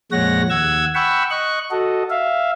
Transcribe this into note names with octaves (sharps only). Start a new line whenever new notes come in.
F2 A#2 G#3 C#5 F#5 A#6
D#2 F#5 E6 G#6
F#5 G5 B5 C#6 E6
D#5 C#6 F#6
F#4 A4 D#5
E5 F5